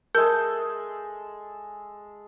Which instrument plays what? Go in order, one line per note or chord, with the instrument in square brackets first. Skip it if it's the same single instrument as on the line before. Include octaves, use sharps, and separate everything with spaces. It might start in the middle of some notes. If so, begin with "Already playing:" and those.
[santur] G#3 A4 [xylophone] A#4 G6